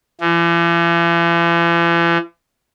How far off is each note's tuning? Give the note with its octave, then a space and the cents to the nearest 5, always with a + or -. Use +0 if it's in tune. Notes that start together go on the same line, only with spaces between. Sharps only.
E3 +45